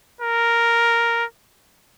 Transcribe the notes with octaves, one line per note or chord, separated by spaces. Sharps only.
A#4